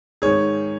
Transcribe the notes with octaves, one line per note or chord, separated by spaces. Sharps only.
G#2 D#3 G#4 C#5